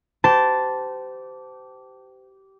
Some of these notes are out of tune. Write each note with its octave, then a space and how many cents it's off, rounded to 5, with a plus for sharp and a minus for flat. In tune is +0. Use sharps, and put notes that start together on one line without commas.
G4 -20 C5 -30 A5 +0